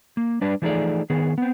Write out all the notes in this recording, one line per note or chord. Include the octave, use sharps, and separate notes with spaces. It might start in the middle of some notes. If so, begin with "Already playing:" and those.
A#3
G3 D4 B4 D5
E3 F3 A3 D#4 G#4 D5
D#3 B3 G#4
B3 C4